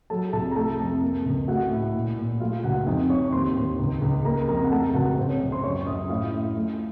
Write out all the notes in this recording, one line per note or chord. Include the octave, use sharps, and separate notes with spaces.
F#3 A4 A5
C2 A4 A5
A#5
A3 A4 A5
F2
A#3
C#2
A3 F#4 F#5
A2
A#2
A#2
A3 F4 F5
C#2 F#4 F#5
F2 D#4 D#5
F2 C#5 C#6
D#2 C5 C6
D#2
C#2
C#2
A#3 A#4 A#5
F2 A#4 A#5
F#5
A3 A4 A5
C#2 F#4 F#5
C#2 C4 C5
C#4 C#5
C#2 C#4 C#5
C5 C6
F#2 C#5 C#6
F#2 D#5 D#6
A2 F4 F5
A2
A3